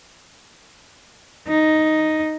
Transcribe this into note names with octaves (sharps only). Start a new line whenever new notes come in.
D#4